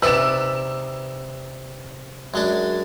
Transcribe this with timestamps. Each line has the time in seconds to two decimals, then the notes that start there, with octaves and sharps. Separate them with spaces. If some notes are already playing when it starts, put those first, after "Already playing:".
0.02 C3 D#4 B4 D5 E6 E7
2.34 F#2 G#3 D4